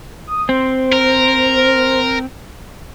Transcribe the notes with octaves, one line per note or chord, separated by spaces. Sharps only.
D#6
C4 C5
A#4